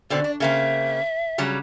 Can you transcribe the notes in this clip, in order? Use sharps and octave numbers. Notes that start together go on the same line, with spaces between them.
B2 D3 C4 D5
D4
C#3 A#3 C4 E5
C#3 F#3 G3